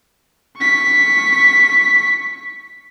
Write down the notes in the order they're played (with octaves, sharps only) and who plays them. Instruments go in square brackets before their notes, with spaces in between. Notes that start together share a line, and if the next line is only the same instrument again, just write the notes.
[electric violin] C#6 B6